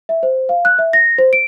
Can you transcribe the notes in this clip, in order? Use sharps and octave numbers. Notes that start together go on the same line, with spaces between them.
E5
C5
F5
F#6
E5
A#6
C5
D7